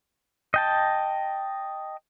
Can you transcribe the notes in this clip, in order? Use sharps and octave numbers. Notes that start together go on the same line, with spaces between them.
D#5 G5 A5